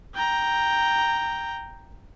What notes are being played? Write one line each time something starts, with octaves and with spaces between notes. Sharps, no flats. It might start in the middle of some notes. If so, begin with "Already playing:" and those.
G5 A#5